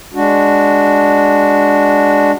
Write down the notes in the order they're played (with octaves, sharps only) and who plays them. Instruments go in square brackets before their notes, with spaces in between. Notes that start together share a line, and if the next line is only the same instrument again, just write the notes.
[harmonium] G#3 D4 F#4